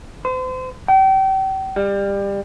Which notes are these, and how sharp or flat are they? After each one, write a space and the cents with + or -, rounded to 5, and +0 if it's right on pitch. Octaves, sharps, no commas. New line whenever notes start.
C5 -35
G5 -35
G3 +25